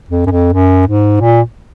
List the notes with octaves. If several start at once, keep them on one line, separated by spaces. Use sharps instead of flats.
F2
F#2
F2
F#2
G#2
A#2